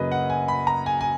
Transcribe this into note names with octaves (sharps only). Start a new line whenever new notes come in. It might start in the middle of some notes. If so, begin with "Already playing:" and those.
Already playing: F#2 C#3 F#3 A#3 B4 D#5
F#5
G#5
B5
A#5
G#5
G#5